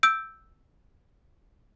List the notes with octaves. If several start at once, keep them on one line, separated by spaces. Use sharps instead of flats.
E6 G6 D7